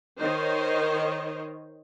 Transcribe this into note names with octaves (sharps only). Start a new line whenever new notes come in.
D#3 D#4 C5 C#5 D#5